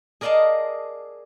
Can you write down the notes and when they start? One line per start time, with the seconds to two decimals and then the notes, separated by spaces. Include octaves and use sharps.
0.21 G#4 A#4 D5 D#5 F5 A5